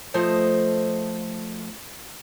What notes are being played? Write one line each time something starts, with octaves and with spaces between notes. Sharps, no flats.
F3 A3 C5 D#5